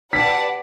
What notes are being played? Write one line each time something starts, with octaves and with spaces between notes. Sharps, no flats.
G4 B4 D5 F#5 A5 B6